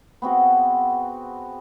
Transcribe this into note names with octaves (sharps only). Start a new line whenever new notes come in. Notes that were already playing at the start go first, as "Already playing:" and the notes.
B3 C4 F#4 G#4